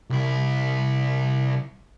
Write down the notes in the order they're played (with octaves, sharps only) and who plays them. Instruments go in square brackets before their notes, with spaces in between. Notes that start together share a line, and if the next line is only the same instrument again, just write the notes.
[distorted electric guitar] C2 E4